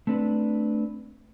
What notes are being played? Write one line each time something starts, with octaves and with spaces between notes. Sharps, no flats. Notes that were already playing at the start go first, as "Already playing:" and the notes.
A3 C4 D4 B4